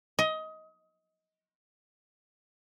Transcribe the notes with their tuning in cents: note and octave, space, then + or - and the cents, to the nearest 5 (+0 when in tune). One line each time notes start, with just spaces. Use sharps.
D#5 +20